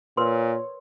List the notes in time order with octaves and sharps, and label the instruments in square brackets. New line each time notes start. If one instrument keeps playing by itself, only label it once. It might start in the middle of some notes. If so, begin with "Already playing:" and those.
[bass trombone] A#2 [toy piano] A#4 B4 C6 [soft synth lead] C#5